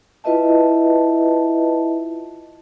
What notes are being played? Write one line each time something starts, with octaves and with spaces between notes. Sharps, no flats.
E4 F4 B4 D#5 E5 A5